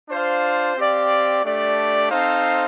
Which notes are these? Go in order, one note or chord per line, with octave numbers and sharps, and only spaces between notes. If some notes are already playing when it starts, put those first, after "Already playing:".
D4 F4 C5 F5
C4 G4 D5 F5
A3 D4 G4 D5
C4 D#4 A4 C5 F5